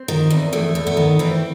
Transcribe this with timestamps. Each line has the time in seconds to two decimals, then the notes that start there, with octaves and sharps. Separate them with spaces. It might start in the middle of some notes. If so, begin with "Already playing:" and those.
Already playing: C4
0.08 D#3
0.30 E2
0.53 E2 A3
0.75 E2
0.87 B3
0.97 D#3
1.19 E3 C4